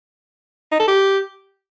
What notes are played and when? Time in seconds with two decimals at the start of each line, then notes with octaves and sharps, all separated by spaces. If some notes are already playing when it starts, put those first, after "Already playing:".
0.72 D#4
0.80 A4
0.88 G4